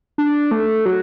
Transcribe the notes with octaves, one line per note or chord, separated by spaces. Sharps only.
D4
A3
F#3